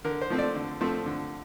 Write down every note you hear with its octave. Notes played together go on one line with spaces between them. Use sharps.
D3 A#4
C5
F3 A3 C4
D5
D3
F3 A3 C4
D3